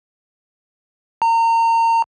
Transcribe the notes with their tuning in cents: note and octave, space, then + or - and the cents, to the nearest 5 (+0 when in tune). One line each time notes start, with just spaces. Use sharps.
A#5 -30